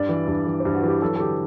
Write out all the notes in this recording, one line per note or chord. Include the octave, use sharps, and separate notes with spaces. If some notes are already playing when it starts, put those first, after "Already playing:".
Already playing: G2 D5
E3
G2
E3
C5
G2
F#4
E3 G4
F#3 A4
A4
D3 G4